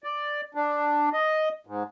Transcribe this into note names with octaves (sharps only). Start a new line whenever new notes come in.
D5
D4
D#5
G#2